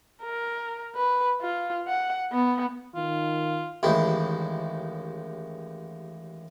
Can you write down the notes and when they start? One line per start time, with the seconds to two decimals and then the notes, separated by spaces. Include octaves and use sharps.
0.23 A#4
0.95 B4
1.42 F4
1.88 F#5
2.32 B3
2.95 D#3 F4
3.83 A1 D#2 G#3 E4